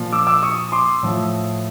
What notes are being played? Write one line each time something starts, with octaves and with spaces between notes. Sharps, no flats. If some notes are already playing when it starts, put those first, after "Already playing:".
Already playing: A#2 F3
D6 E6
D6 E6
C#6 D#6
C6 D6
A2 F3